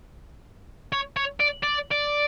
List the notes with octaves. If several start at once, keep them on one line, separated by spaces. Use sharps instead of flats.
C#5
C#5
D5
D5
D5